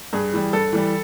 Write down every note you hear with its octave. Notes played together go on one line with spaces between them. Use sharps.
G2 G#4
E3 G3
G2 A4
E3 G3